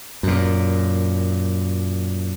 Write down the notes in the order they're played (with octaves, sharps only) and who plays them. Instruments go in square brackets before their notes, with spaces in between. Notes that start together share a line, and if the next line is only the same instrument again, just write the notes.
[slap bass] F#2 A#2